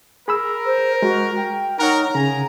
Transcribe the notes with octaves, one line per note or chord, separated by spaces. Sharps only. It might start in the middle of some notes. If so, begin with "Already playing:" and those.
G#4 A#4 B5 E6
C5
G#3 F#4
G5
D#4 A#4 C#5 F#5 A#5
C#3 G#5 A#5